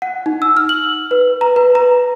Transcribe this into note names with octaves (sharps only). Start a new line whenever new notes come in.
F#5
D#4
E6
F6
F#7
B4
A#5
B4
A#5